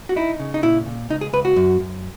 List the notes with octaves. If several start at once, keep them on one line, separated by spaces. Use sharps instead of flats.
F#4
D#4 E4
C#3
D#4
A#2 E4
A#2
C#2 D#4
G#4
C#2 B4
F#4
F#2
F#2